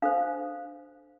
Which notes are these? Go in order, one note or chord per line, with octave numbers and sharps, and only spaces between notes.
D4 A4 C5 F5